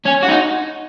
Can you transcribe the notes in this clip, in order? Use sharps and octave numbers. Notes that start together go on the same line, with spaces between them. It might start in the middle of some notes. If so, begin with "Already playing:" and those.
C#4
F#4
D#4